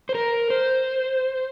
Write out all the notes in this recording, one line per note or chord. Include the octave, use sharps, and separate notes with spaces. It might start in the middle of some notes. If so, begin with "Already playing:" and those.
C5
A#4
C5